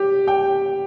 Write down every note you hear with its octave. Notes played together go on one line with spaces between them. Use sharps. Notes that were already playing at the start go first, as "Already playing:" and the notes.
Already playing: G4 G5
G4 G5